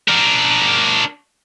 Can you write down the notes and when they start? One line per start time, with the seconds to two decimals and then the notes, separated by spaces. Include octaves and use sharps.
0.08 D4 A#4